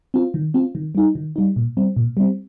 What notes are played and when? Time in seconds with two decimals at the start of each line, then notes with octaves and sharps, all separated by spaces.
0.14 C4 F4
0.34 D#3
0.54 C4 F4
0.75 D#3
0.95 G3 D#4
1.15 D#3
1.36 G3 D#4
1.56 A#2
1.77 G3 C4
1.97 A#2
2.17 G3 C4